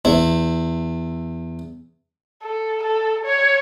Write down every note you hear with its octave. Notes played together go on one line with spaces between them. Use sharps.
E2 E4
A4
A4
C#5